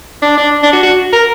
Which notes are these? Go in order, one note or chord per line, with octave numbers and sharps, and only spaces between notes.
D4
D4
D4
F#4
F#4
A#4